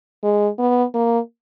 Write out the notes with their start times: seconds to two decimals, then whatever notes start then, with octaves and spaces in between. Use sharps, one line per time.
0.24 G#3
0.59 B3
0.94 A#3